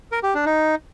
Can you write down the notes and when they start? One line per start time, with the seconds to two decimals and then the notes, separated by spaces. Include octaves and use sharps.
0.12 A#4
0.23 G4
0.35 D4
0.46 D#4